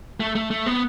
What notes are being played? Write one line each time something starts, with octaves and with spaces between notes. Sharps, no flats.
A3
A3
A3
B3